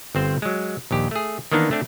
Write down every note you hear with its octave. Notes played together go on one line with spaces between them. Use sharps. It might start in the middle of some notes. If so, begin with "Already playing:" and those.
G1 C4 C5
F#3 G#3
A#1 D#2 G4
A3 G#4
D#3 E3 A#3 B3 D4 D#4
A3 C4 D4 D5